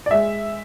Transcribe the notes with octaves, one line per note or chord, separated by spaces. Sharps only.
D5
G#3 E5